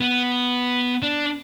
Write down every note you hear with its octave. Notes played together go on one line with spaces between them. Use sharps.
B3
D4